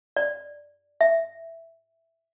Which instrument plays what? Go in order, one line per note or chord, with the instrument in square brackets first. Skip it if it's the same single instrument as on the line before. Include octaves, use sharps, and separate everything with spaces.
[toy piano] D5
E5